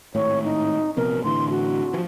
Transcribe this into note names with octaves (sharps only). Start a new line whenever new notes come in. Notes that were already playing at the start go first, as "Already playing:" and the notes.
G#1 A2 C#5
D#4
A#1 C3 B3 A#4
A2 D3 E3 C6
F#4
E3 F3